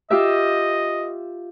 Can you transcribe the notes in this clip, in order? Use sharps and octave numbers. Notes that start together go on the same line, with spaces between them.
F4 G4 D#5 E5